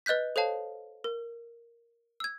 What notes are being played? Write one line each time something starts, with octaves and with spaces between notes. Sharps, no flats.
B4 D#5 F#6 G6 B6
A4 C5 C#5 F5 A5
A#4
E6 G#6